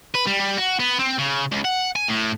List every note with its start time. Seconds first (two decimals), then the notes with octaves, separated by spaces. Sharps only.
0.14 B4
0.27 G3
0.40 G3
0.57 F#4
0.79 B3
0.99 C4
1.18 C#3
1.52 C#2
1.65 F#5
1.96 G#5
2.08 A2